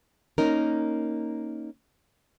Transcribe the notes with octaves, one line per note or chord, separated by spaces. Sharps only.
A#3 C#4 D#4 A#4